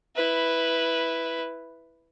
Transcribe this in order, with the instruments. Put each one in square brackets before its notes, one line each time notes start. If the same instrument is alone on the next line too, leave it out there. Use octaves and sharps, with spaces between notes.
[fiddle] E4 B4